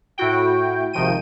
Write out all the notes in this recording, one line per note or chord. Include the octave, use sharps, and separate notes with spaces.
A2 E4 F#4 G5
G#1 C3 D#3 F3 G5 D#7